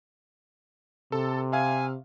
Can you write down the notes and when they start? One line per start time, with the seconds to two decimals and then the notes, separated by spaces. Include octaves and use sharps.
1.12 C3 A4 A5
1.52 E5 F5 G#5